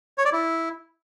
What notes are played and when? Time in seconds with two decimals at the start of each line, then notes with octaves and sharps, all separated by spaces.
0.18 C#5
0.25 D5
0.32 E4